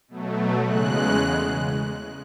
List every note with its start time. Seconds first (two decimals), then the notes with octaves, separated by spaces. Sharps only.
0.08 B2 F#3 A3
0.66 E2 C#3 G#3 F#6